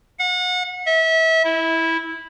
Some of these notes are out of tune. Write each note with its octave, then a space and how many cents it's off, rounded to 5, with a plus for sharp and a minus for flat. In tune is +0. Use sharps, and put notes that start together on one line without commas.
F#5 -35
E5 -30
E4 -10